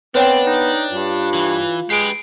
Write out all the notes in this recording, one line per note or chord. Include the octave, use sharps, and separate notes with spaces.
B3 C4 D4 B4 C#5 G5
D#4
G2 F4
E3
G#3 G4 B4 C7 D7